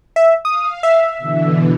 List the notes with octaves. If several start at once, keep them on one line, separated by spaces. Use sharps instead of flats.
E5
F5 D#6
E5
B2 D3 E3